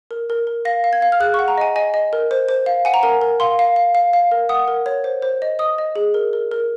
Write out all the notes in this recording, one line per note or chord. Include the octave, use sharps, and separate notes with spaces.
A#4
A#4
A#4
F5 A#6
F5
G#6
F5
F6
G#4 F#6
C#6
F#5
A#5
D#5 G#5
D#5 G#5
D#5
A#4
C5
C5
F5
F#5 G#5
A#5
A#4 G#5
A#4
F5 C6
F5
F5
F5
F5
A#4
F#5 D#6
A#4
C#5
C5
C5
D#5
D#5 D#6
D#5
G#4
A#4
A#4
A#4